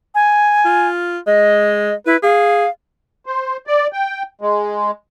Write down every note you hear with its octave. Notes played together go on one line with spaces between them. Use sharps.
G#5
F4
G#3 D#5
E4 B4
G#4 F5
C5
D5
G5
G#3